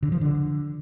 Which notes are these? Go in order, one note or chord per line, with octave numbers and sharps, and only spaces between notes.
D3
F3
D3